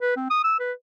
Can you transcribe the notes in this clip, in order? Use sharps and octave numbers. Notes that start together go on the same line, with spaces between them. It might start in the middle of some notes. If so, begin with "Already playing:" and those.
B4
C4
D#6
E6
B4